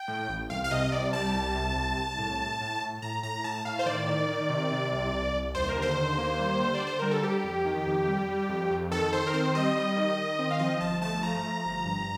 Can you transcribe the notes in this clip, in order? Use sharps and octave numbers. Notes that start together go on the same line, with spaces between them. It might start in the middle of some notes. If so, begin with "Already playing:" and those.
Already playing: G5
A2
A1
C2 F5
F5
C3 D#5
C2 D5
G3 A5
C2
C3
C2
C2
A2
A2
A2
A2
A2 A#5
A2 A#5
A2 A5
A2 F5
C5
D#3 D5
D#3
D#3
C3
C3
C2
C2
C2
D#2 C5
A#4
D3
C5
D#2
A#3
G3
D3
D5
D3
C5
G3 A#4
A4
G3 G4
F2
D#3
F2
G3
G3
F2
F2
D#3 A4
D#3 C5
A#4
C4 C5
G3 D#5
G3
D#3
D#3
C4
F5
F3 D#5
G1 A5
A3 A5
F3 A#5
F3
G1
G2